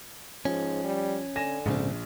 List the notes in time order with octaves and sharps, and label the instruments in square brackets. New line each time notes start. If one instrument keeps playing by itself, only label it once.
[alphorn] G#2 [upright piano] F3 [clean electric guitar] C#4
[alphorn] G3
[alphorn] D3 [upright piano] G#5 A#6 E7
[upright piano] A#1 [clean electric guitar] G#2 C#3 C4